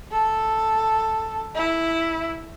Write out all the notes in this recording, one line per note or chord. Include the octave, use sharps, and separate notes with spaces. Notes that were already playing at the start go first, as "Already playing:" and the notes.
A4
E4